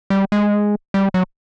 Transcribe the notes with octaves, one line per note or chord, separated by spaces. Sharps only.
G3
G#3
G3
F#3